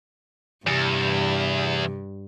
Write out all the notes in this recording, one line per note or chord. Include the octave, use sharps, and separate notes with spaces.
E2 G2 C3